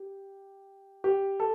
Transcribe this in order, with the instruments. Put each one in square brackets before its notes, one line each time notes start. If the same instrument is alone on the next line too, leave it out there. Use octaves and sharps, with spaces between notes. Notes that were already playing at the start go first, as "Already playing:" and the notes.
Already playing: [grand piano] G4
G4
A4